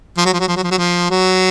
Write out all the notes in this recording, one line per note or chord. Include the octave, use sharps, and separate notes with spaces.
F3
F#3
F3
F#3
F3
F#3
F3
F#3
F3
F#3